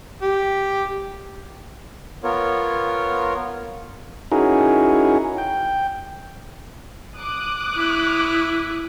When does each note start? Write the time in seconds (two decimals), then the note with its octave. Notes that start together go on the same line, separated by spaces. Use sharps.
0.22 G4
2.23 B3 F4 A#4 C#5
4.32 C#4 D#4 E4 F#4 G#4 A#4
5.38 G5
7.16 D6 D#6 F#6
7.77 E4